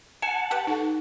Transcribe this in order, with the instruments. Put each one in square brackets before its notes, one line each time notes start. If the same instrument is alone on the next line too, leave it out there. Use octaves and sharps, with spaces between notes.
[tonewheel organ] F#5 A5 [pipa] G#5
[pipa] G4 B4
[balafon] D#4 A4